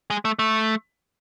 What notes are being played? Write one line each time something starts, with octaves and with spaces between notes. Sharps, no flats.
G#3
A3
A3